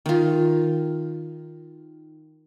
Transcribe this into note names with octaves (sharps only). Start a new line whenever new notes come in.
D#3 F4